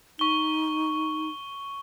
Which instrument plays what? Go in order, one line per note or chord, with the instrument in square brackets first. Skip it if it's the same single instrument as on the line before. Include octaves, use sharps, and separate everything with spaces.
[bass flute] D#4 [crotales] C#6 G7